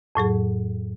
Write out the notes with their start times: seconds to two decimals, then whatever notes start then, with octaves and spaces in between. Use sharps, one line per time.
0.15 F2 A2 F#3 G#4